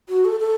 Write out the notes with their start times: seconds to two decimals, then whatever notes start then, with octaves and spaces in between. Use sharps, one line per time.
0.09 F#4
0.25 A4
0.40 A4